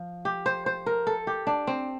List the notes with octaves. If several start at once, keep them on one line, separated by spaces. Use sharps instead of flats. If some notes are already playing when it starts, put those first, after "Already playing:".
Already playing: F3
G4
C5
C5
A#4
A4
G4
D4
C4